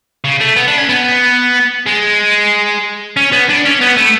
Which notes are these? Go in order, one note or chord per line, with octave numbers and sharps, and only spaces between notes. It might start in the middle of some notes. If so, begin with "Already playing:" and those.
C#3
A3
B3
D4
C#4
B3
G#3
C#4
B3
D4
C#4
B3
A3